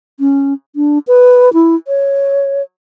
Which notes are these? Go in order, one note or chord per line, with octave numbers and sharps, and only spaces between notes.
C#4
D4
B4
E4
C#5